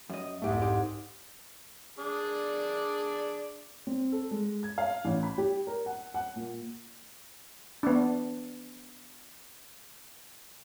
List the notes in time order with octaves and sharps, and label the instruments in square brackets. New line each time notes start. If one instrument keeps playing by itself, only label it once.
[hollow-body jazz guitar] F#2 D#5
[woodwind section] C2 F2 G#2 [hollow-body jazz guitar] A3 G4
[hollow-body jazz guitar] G4 C6
[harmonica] D4 G#4 D5
[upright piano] C4
A4
G#3
G#6
F5
A1
B5
G4
A#4
F#5
F#5
A#2
[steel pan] B3 D4